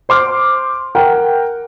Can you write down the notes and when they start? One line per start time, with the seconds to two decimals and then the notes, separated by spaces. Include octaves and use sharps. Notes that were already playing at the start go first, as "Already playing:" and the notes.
0.09 C5 C6 D6 F6
0.95 A#4 F#5 G5